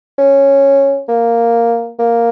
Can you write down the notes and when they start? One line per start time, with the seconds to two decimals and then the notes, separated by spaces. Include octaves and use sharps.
0.18 C#4
1.08 A#3
1.99 A#3